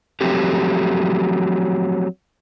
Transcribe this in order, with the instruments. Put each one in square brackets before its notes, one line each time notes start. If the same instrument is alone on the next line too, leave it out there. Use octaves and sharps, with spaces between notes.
[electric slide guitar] F3 F#3 A3 C4 G4